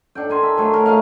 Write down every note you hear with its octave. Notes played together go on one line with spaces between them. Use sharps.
D4 A4 G5
A#4 G#5 C6
E5
F#3 A3 C#5
A#4
A3 G#4 D#5 F5